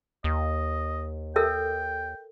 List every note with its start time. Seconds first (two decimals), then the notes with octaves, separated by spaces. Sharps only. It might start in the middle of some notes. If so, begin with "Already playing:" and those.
0.24 D#2 D#5
1.36 A4 A#4 E5 G5